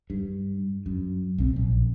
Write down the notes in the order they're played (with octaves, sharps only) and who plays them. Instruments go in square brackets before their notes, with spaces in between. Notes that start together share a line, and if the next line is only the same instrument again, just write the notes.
[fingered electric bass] G2
F#2
B1 C4
A#1